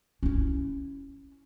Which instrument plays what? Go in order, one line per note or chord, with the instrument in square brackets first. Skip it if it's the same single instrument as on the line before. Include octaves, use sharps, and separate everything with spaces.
[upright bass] C#4 E4